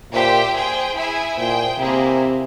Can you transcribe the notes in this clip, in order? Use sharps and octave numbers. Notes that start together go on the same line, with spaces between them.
A#2 G4 C5 E5 G5
G#4 C5 G5
E4 G#4 E5 G#5
A#2 G#4 C5 G5
C3 A#3 E4 G#4 C5